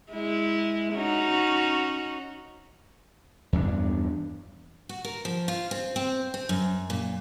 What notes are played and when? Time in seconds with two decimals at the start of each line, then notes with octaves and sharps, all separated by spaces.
0.12 G#3 E4
0.93 C#4 D#4 F#4
3.53 E2 G2 C4 D4
4.89 F#4
5.04 A#4
5.25 F3
5.48 F4
5.71 C4
5.96 C4
6.34 C4
6.49 F#2
6.90 A#2